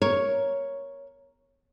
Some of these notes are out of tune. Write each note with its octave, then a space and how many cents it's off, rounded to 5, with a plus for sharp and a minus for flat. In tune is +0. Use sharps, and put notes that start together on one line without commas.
A#4 +0 C#5 +0